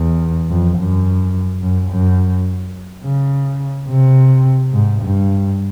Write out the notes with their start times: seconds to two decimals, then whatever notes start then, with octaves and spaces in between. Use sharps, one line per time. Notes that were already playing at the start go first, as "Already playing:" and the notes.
Already playing: E2
0.49 F2
0.78 F#2
1.62 F#2
1.91 F#2
3.03 C#3
3.88 C3
4.73 G#2
5.01 G2